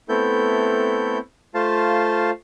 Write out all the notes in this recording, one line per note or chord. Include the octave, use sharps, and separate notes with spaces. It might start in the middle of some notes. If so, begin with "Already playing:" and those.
A3 B3 C4 E4 A4 G6
A3 F4 C5 F5 A5